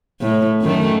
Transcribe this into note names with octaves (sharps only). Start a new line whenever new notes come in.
A2
F#2 D#3 A3